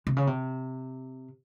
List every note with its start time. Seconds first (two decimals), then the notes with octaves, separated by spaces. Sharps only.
0.07 C3
0.16 C#3
0.27 C3